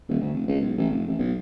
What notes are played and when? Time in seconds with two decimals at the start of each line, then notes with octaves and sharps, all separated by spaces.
0.09 D#1
0.21 D2
0.34 F1
0.48 C#2
0.61 B1
0.78 A1
0.90 F1
1.08 A1
1.19 B1